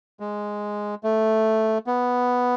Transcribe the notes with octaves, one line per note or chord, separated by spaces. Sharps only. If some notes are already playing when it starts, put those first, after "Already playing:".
G#3
A3
B3